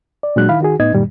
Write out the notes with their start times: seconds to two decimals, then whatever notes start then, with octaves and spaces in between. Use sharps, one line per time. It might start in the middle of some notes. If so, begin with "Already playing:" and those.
0.23 D5
0.36 A#2 F#3 G#3 D4 F#4 F#6
0.49 D#3 E4 F5 B5
0.60 D#3 F#4 G#4
0.80 A2 B3 D#4 D#5 G#6
0.93 F#2 A#2 D#3 G3